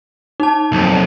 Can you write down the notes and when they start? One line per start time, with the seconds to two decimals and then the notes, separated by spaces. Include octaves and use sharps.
0.40 D#4 A5
0.72 B1 F2